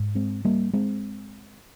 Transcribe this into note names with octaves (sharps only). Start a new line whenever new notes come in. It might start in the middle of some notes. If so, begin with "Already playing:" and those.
Already playing: G#2
G#3 C4
G3 A#3
G#3 C4